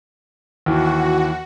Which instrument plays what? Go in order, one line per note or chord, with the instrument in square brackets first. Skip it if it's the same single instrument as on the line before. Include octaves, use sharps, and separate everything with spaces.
[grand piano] D#2 E3 [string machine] F#4